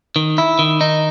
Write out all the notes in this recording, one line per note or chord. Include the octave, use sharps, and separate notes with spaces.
D#3
E4
D#3
D#4